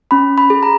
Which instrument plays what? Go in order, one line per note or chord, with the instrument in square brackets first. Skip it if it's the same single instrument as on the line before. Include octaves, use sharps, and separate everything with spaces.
[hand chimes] C#4 B5
B5
G#4
A#5